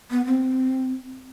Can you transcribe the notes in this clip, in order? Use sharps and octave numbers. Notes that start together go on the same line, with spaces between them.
B3
C4